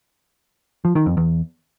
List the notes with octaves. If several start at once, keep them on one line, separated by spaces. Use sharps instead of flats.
F3
D#3
F2
E2